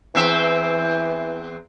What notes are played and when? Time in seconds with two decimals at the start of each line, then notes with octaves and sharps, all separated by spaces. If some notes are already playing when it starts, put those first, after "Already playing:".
0.15 E2 E3 C4 E5